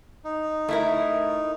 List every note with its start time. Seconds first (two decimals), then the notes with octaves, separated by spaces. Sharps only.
0.24 D#4
0.69 A3 E4 A#4